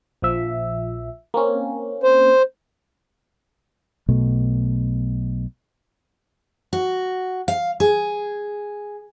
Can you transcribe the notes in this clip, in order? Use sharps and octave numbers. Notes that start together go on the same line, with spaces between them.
A#1 F3 E5
A#3 C4 C#4
C5
B1 B2 A3
F#4
F5
G#4